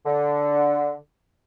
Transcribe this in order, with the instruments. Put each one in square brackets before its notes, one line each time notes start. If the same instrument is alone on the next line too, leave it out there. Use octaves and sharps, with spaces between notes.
[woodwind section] D3